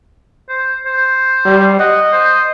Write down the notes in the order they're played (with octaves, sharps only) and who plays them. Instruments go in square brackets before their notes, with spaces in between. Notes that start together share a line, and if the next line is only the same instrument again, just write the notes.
[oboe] C5
C5
[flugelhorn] G3
[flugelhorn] D#5 [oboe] F#5
[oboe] C5